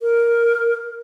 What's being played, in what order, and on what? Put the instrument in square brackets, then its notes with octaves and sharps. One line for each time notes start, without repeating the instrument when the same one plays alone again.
[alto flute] A#4